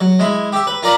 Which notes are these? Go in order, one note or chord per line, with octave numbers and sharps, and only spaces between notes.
F#3
G#3 E4
G4 E5
B4
F4 A#4 D5 A#5 B5